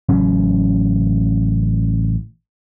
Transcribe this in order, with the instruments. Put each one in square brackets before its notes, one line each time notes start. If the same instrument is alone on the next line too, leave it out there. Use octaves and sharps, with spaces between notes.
[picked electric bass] A1 C#3 F#3 C#4